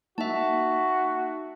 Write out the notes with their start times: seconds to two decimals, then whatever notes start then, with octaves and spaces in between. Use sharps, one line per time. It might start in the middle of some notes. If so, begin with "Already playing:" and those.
0.18 A#3 D#4 F#4 E5 A5